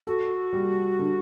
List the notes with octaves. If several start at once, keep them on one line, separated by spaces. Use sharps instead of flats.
F#4 A4
G3
D3